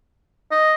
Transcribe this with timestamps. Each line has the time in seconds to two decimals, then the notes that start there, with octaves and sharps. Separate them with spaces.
0.52 D#5